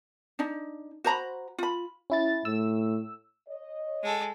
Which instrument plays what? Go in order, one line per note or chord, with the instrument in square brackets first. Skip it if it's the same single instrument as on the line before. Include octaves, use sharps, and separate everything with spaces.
[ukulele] D4 D#4
F#4 C5 A#5 B5
F4 B5
[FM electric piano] C#4 E4 A6
[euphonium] A2 [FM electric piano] E6
[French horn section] C#5 D#5
[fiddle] G#3 A4